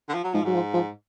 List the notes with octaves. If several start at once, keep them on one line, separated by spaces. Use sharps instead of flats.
D3
F3
F#3
G#2 F3
G#2 F#3
F3
F3